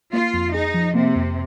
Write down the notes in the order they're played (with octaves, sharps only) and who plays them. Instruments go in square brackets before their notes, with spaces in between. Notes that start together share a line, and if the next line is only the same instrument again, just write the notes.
[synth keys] A#3 [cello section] F4
[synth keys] F2
[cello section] D#4 [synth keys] G#4
[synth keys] F3
[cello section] C3 [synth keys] A#3
[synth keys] F2